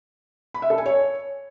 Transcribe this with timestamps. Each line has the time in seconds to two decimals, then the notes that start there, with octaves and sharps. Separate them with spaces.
0.54 B5
0.62 E5
0.70 A4
0.78 G#5
0.86 C#5